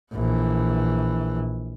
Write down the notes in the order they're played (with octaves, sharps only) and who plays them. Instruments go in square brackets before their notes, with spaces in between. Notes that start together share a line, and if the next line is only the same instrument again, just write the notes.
[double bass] A#1 E3